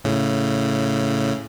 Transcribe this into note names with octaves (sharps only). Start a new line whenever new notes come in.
A2 C#3